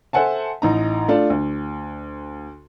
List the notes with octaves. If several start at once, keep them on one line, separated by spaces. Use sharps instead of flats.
A4 C5 E5 F#5 G#5 A5
A1 D#4 A#5
A3 D4 F4
D2